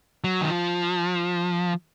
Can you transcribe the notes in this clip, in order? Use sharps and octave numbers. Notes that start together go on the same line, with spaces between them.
F#3
D#3
F3